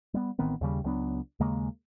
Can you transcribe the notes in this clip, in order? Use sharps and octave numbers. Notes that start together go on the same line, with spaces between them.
G3 B3
A1 D#3 B3 C4
D#2 C#3 G3
C#2 F#3 B3 D4
D#2 C#3 G#3 A#3